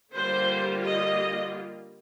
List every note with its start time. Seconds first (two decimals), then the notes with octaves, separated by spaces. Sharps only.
0.14 D3 G3 A#3 F4 C5
0.87 D#5